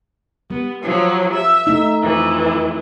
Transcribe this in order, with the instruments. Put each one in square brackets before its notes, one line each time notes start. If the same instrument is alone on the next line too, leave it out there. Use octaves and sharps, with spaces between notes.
[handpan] G3 [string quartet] B3
[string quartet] F3 F#3
E5
[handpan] A3 D#4
[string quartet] F2 E3